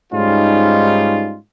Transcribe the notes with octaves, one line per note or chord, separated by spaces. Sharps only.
G#2 G3 C#4 D#4 F4